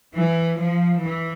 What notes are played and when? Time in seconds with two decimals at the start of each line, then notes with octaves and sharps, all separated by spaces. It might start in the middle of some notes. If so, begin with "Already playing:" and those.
0.15 E3
0.59 F3
1.01 E3